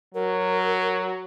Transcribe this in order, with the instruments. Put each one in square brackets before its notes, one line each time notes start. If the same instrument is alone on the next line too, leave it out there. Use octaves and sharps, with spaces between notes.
[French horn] F#3 [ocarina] A#4